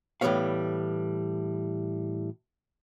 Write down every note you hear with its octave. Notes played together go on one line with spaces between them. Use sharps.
A2 E3 G3 B3 C#5 F5